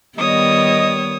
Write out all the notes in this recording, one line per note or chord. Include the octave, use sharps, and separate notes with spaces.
D#3 G3 B3 C#5 D#5 D#6